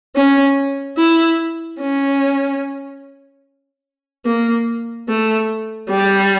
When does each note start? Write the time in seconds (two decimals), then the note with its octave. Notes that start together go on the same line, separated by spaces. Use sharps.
0.16 C#4
0.98 E4
1.80 C#4
4.26 A#3
5.09 A3
5.90 G3